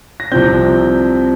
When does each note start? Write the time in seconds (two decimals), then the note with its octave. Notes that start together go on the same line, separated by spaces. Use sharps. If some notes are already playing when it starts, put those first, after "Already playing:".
0.20 A#6
0.32 C2 C3 F3 C4 G6